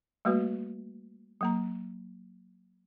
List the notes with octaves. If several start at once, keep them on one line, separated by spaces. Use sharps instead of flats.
G3 A3 A#3 F#4 B4
F#3 A#3 A#5